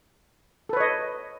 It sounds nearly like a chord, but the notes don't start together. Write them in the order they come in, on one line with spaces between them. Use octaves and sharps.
A4 B4 C#5 D#5